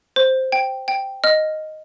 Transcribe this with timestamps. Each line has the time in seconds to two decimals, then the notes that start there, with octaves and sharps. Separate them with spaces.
0.16 C5
0.52 G5
0.88 G5
1.24 D#5 F6